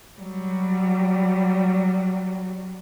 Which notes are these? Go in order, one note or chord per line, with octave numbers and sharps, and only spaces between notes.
F#3 G3